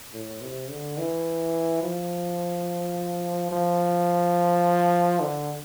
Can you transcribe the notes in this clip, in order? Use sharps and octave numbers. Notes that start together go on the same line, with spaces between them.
A2
C3
D3
E3
F3
F3
D3